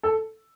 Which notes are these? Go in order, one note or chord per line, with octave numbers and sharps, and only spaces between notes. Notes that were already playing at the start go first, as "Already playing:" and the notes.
A4